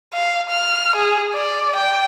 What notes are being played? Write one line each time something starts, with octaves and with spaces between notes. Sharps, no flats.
F5
F6
G#4
D5
G5